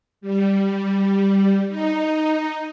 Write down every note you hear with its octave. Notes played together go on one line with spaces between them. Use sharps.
G3
D#4